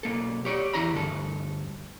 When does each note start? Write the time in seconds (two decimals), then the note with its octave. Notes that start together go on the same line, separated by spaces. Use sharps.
0.03 B1 A#3 A4
0.45 G4 C#5 D5
0.74 E2 E3 E4 A#5 B5
0.94 D2 G2 A4